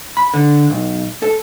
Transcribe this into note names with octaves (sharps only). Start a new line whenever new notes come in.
B5
D3
B1
A4